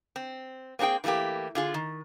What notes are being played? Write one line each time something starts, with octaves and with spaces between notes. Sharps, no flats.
C4
A#3 C4 D4 G#4 G5
E3 G3 A3 A#3 G4
D3 F4 G#4
D#3